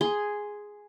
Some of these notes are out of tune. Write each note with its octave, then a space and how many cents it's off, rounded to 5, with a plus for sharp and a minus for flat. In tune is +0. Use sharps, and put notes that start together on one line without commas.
G#4 +0 C6 +0